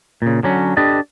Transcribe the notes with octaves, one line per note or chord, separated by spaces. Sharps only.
A#2 C#3
D3 F#3 C#4
D4 G4 A4 B4 D5 D#5